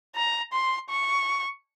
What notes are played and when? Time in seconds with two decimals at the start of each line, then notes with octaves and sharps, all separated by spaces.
0.15 A#5
0.53 C6
0.90 C#6